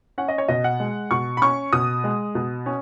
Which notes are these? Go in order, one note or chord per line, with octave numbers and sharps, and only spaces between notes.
C#4 F#5
D#5
C#5
B2 D#5
F#5
G#3
B2 C#6
B5
C#4 C#6
B2 D#6
G#3
B2
C#4